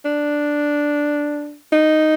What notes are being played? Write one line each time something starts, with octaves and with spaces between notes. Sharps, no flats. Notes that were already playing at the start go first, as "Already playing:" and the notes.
D4
D#4